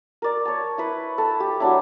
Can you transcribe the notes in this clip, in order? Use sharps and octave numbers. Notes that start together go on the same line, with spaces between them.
A#4 D5
C#5 A5
E4 B4
A4
G4
F#3 D4 E4